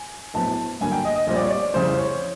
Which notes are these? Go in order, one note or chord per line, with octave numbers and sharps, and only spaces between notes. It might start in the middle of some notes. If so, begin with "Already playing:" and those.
Already playing: G#5
A#1 A2 F#3 B3 A5
G2 D3 F#3 A#3 G#5
G5
D#5
D#5
A#1 A#2 G3 C4 D#5
D5
C#5
D5
F2 C#3 E3 G3 C5
C#5